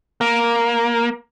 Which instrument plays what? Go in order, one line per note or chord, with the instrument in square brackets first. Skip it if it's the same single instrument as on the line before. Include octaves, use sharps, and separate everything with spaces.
[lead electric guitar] A#3